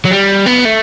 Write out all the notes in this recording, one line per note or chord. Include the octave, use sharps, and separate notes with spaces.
F#3
G3
B3
A3